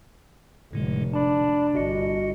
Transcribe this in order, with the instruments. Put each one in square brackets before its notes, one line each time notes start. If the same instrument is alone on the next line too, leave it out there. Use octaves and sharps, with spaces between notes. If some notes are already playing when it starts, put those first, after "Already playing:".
[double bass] F1 [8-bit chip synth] A2 D3 G#3
[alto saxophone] D4 [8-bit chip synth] A5 B5
[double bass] G1 [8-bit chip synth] F#4 D#5 C#7